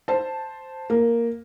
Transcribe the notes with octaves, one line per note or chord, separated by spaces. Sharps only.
C5 A5
A#3